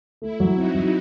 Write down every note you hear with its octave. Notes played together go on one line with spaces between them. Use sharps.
A3 E4
F#3
C4 D#4 F#4
F#3